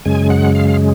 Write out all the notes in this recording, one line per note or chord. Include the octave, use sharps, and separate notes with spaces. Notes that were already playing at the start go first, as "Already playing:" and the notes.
F#2 C#3 G#3 G#5
F#5
F5